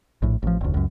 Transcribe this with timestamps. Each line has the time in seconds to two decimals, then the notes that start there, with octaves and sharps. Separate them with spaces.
0.22 A#1 A2
0.42 A1 F3
0.61 F1 D2
0.74 C#2 F#2